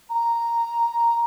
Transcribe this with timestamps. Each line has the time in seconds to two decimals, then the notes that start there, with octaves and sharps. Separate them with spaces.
0.10 A#5